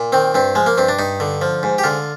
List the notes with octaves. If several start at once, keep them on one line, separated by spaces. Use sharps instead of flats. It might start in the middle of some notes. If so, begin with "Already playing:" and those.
Already playing: A#2
D#3 C4
G2 C4
F3 G#3
A#3
G2 C4
D4
G2 D#4
D3
F3
G#2
G4
D3 F4